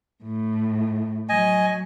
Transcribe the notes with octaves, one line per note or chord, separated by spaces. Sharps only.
A2
F#3 D#5 G#5